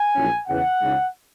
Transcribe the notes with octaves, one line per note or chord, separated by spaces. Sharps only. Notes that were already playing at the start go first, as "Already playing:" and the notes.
Already playing: G#5
A#1 A#2 F#3 C#4 E4
E2 C#3 E3 F#5
C#2 C#3 G#3 D#4